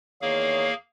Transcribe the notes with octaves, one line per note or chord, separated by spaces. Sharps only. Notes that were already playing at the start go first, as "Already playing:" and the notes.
E2 D#3 A#3 G#4 C#5 F5